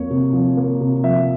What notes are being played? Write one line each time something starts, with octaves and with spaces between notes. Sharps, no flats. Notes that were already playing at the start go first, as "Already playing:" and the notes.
Already playing: F2 A#3 C#5
C3
F3
A#3
C3
F3 E5